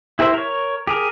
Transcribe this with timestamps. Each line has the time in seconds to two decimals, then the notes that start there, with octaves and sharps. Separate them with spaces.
0.19 E4 G4 A#4 C5 E5
0.34 A#4 C#5
0.87 G4 G#4 A#4